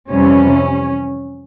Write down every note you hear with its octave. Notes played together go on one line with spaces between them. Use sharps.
F2 C3 E3 G3 C#4